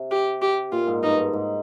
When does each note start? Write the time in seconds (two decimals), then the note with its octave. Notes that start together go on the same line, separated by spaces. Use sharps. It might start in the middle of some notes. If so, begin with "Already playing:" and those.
Already playing: C3
0.11 G4
0.42 G4
0.72 A#2 F4
0.87 G#2
1.02 G2 D#4
1.18 G#2
1.33 G#2